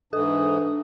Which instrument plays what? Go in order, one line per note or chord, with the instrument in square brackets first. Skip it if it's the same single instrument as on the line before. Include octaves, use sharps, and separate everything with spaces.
[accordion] G#2 E3 [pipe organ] D4 [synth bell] A4 [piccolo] D#6